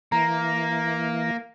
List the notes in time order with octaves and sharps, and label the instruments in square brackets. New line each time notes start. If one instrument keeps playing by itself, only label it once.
[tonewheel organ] E3 [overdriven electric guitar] A#3 [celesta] A#5